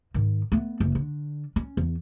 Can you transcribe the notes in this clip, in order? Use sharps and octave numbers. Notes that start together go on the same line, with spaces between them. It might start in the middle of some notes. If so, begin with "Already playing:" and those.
G#2 D#3
A3 B3
F#1
D3
C#4
E2